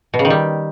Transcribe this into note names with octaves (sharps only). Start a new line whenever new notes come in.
B2
C#3
D#3
G3